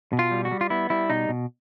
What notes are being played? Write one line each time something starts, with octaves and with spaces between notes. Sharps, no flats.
B2
F4
G3
F#4
G3
F4
B3 E4
G3 E4
B2 D#4
B2